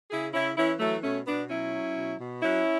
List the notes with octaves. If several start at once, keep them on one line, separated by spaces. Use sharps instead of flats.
C#3 E4 G#4
C#3 C#4 E4
E3 C#4 E4
E3 F#3 A3
B2 A3 C#4
B2 B3 D4
F#3 C#4 E4
F#3
B2
B2
F#3 C#4 E4